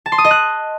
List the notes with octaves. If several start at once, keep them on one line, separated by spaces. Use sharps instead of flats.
A5
C6
D#6
D#5
F#6